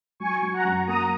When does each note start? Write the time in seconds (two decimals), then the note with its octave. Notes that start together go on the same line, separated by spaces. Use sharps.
0.20 F#3 G#5 C#6
0.42 F#3
0.53 F#5 A#5
0.65 F#2
0.87 A#3 A#5 D#6